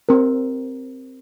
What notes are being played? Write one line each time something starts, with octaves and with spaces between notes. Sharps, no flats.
C4 A#4